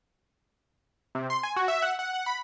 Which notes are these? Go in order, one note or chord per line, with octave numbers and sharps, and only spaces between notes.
C3
C6
G#5
F#4
E5
F#5
F#5
F#5
B5